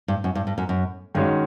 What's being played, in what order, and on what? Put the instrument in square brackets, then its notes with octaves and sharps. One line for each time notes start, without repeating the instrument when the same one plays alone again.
[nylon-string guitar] G2
F#2
G2
G2
F#2
F#2
[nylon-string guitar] G2 [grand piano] D#3 G#3 C#4 F#4